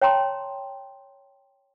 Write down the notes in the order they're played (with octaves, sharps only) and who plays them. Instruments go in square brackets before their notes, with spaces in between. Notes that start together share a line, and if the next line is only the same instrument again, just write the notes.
[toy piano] C#5 G5 A5 A#5 C6